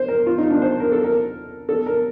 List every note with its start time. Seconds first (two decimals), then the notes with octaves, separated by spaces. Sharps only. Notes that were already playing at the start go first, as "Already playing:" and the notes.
Already playing: C5
0.08 A#4
0.27 F4
0.38 D#4
0.50 D4
0.62 C5
0.80 A#4
0.92 A4
1.04 A#4
1.69 A4
1.86 A#4